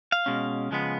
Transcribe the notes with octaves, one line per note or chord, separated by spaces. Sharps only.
F5
B2 G#3 C#4
C#3 F3 G#3 B3